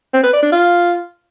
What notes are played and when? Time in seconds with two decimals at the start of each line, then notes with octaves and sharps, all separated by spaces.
0.14 C4
0.23 B4
0.33 D5
0.43 D4
0.52 F4